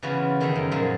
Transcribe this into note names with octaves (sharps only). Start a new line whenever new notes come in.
C#3 E3 B3 F4 F#4
D#3 A3 C#4 G#4 E5
F#2
A#2 F3 F#3 G#3